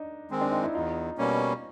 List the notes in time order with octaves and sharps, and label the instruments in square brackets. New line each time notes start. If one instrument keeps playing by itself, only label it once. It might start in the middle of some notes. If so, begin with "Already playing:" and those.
Already playing: [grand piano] D4 D#4
[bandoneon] D#3 G#3 C4
[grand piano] D4
D#4
E4
[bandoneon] E2 [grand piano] D#4 F4
[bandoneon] B2 G3 A#3 C#4